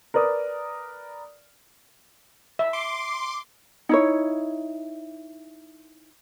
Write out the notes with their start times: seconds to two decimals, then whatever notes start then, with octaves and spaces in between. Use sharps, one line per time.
0.14 A#4 B4 D5 D#6
2.59 E5
2.73 C6 D6
3.89 D#4 E4 C#5